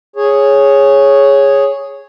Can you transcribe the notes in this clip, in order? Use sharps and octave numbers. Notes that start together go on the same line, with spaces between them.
G#4 C#5